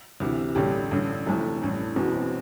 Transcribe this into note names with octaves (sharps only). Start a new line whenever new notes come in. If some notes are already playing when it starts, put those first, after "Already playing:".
D2 C3 E3
A1 G2 D3 G4
A1 G2 D3
F1 F2 E3 A3
A1 G2 E3
E1 E2 B2 B3
C4